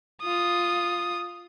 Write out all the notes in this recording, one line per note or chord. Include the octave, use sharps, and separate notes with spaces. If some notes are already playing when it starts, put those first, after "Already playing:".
F4 D#6